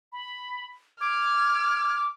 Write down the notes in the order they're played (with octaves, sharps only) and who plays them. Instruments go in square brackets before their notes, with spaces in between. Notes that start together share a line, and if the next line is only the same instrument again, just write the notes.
[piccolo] B5
[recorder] D6 [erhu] F6 [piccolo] G#6